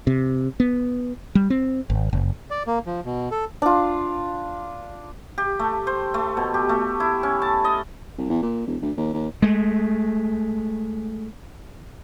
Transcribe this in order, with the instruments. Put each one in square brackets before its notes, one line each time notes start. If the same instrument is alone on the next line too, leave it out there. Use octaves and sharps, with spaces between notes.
[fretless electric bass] C3
B3
G3
C4
G#1
F#1
[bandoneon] D5
A#3
F3
B2
A4
[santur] D4 F4
[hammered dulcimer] G4
A3
C5
A3
B2
G4
A3
E4
C#4
A5
D#5
[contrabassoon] C2
E2
A#2
E1
D2
D#2
D#2
[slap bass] G#3 A3